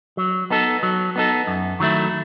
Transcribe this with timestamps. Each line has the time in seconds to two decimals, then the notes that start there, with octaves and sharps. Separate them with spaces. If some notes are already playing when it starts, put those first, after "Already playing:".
0.17 F#3
0.50 B3 D#4 A4
0.83 F#3
1.16 B3 D#4 A4
1.47 F#2
1.80 D#3 F#3 A3 E4